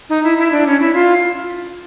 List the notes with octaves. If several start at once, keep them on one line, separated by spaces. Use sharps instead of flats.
D#4
E4
E4
D4
C#4
E4
F4